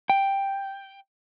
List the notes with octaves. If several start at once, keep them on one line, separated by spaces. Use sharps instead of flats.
G5